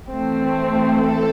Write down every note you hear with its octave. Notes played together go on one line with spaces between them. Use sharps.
E3 A3 C4
A4